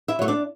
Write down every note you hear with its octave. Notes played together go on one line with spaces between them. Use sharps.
E4 E5
F#3 A3 C#5
D4 D5